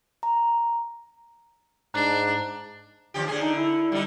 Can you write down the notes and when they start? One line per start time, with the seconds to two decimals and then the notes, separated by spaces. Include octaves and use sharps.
0.23 A#5
1.94 G#2 D4 A#5 F#6
3.14 D#2 F3 G4
3.28 D3 G#4
3.41 D3 D#4
3.55 E4
3.92 D3 G3 D#4